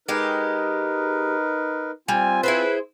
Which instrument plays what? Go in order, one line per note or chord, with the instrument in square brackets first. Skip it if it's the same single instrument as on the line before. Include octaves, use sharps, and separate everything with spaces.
[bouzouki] G#3 G4 [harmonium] D#4 A#4 B4
[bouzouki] G3 [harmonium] C4 F4 [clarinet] G#5
[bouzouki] E4 G#4 C5 [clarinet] B4